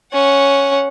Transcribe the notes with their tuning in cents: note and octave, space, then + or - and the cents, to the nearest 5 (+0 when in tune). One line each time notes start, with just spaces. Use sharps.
C#4 +0 F#5 -5